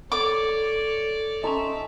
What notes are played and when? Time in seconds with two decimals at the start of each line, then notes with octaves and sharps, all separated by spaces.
0.12 A4 C#5 D5 D6
1.43 C#4 D#4 A4 E5 G#5 C6